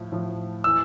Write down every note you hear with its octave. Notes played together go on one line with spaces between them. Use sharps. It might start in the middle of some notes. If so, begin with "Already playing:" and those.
Already playing: A2 F3
A2 F3
E3 E6